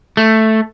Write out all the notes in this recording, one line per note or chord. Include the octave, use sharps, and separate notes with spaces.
A3